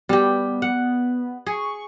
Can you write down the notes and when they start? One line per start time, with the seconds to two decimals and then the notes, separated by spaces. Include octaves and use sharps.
0.09 G3 B3 G4
0.62 F#5
1.46 G#4 C#6